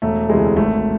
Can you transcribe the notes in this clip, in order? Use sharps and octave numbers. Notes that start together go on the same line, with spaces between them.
E1 A3
D2 C3 E3 G#3
G#1 A3